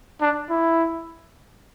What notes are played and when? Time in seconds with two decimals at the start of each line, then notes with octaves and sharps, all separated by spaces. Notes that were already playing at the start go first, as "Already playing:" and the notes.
0.21 D4
0.50 E4